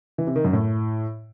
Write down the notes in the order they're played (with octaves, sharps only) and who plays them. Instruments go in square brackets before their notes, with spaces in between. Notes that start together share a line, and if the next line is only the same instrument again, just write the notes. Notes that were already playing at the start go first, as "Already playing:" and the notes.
[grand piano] E3
C3
D#3
F#2
A2